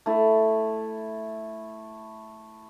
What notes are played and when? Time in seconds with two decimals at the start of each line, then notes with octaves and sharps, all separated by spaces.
0.06 A3 E4